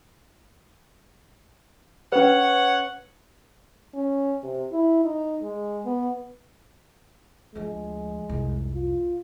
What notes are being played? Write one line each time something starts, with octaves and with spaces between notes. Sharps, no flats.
C#4 B4 C#5 F#5
C#4
C3
E4
D#4
G#3
B3
D2 F3 G#3
C2 F2
F4